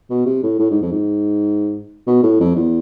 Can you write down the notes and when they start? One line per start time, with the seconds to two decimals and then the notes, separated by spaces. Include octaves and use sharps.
0.10 B2
0.26 C3
0.43 A2
0.59 A2
0.70 G#2
0.82 F2
0.92 G#2
2.07 B2
2.23 A2
2.40 F2
2.56 E2